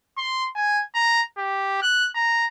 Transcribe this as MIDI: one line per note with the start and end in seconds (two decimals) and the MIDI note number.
0.18 0.46 84
0.55 0.84 80
0.95 1.22 82
1.38 1.77 67
1.82 2.08 90
2.15 2.46 82